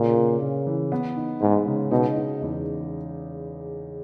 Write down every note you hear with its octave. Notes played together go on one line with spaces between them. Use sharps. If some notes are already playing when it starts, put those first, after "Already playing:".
Already playing: A#2 C#3
C#3
C#3
E3
B3
D#4
G#2 G#3
C#3
B2 D#4
D#4
E2